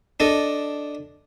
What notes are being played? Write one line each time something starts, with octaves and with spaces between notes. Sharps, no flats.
D4 A4 D#5